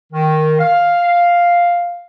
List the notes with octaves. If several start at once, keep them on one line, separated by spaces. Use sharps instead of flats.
D#3
F5